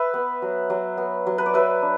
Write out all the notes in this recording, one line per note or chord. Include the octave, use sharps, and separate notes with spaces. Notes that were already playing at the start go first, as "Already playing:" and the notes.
Already playing: B4 E5
B3
F#3
F#3
B3
F#3
B4
D5
F#3 B4 E5
D4